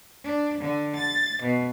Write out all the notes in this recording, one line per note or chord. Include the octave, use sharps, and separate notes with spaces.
D4
D3
A6
B2